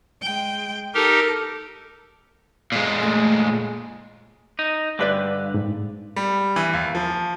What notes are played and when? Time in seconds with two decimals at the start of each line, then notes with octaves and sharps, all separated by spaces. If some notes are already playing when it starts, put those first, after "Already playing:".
0.23 G#3 G5
0.94 D#4 G4 A4 A#4
2.72 A#2 G#3
3.02 A3 G#5
4.59 D#4
4.99 G2 D3 D4 B4 D5
5.54 G#2
6.16 G3
6.56 E3
6.73 D#2
6.95 F3